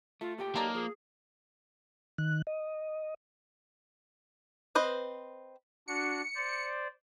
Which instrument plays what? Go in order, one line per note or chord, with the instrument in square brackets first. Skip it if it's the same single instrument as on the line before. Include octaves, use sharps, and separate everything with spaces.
[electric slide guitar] A3 [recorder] F4
[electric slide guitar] A#2 A3 G5 [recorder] G4
[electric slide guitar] F#3 D#4 [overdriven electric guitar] A#3 [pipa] A4 D5 A#5
[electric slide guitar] F3 [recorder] G#4
[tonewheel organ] D#3 F#6
D#5
[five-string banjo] C4 B4 C5 D#5
[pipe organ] D4 F#4 [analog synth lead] C#7
[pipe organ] C5 D5